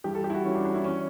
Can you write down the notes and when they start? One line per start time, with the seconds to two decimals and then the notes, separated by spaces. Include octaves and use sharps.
0.04 G2 E3 G4
0.15 A4
0.24 G4
0.30 E4
0.35 F#4
0.44 G2 E3 C#4
0.55 D4
0.65 D4
0.75 E4
0.84 E3 C#4